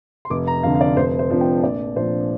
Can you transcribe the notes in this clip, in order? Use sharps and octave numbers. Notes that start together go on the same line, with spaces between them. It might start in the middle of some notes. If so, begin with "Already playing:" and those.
C6
F1 D6
A#5
F2 D3 F5
F5
D5
F1 C5
C5
F2 F3 D4
G5
A#1 D5
A#2 F3 D4 C5